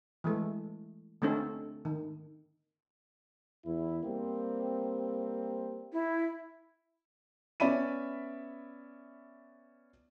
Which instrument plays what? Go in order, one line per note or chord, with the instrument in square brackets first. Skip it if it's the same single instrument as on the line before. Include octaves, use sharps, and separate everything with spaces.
[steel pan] E3 G#3 A3
D3 A3 C4 C#4 D#4 A4
D#3
[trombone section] E2 E4
G3 A#3 C4
[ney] E4
[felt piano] B3 C#4 D5 E5 B5 D#7